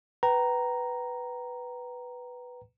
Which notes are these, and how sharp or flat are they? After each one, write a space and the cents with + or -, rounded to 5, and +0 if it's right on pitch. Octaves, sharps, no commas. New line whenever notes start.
B4 +0 G5 -35 A#5 +0